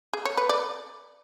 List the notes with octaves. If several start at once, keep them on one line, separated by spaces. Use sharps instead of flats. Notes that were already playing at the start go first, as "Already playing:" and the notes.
G#4
C#5
B4
D5